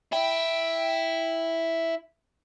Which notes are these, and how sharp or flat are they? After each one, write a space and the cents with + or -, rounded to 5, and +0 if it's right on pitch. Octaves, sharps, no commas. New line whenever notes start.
E4 +0 G5 +0